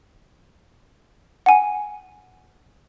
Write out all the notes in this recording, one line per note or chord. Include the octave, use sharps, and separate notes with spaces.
F#5 G#5